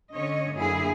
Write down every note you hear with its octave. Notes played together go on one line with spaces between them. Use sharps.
D3 C#4 C#5 D#5
F#2 D3 A#3 E4 G#4